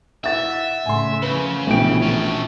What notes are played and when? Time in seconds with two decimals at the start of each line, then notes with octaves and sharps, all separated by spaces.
0.24 E4 E5 F#5 A6
0.86 A2 C#3 G#5 C6
1.22 C#3 E3 F3 A#3 B4
1.67 A#1 B2 E3 A3 B3 E4 G5 D7
2.03 C#4 A4